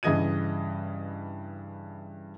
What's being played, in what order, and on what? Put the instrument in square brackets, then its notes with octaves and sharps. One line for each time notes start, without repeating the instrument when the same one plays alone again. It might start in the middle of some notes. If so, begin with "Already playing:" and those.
[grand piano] G2 C#3 E3 D#5 G#6 D#7